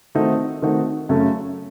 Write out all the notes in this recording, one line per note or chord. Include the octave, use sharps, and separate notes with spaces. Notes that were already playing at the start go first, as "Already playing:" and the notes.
D#3 A3 C4 D#4 F#4
D#3 A3 C4 D#4 F#4
F#2 C#3 A3 C#4